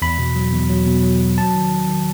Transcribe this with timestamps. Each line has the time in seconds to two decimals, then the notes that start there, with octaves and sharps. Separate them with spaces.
0.02 E2 B5
0.18 B2
0.35 F#3
0.53 E2
0.70 F#3
0.87 B2
1.03 F#3
1.21 F#3
1.37 F#3 A5
1.55 D#3
1.72 D#3
1.89 D#3